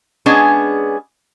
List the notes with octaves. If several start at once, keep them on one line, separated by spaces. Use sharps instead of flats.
G#3 B3 C#4 D4 G#4